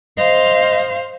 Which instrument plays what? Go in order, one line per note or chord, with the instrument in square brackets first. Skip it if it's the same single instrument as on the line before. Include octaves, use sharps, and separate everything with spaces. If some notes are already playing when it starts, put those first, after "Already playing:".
[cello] C5 F5 [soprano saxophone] D#5